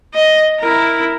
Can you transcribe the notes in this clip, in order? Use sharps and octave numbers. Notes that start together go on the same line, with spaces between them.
D#5
E4 A#4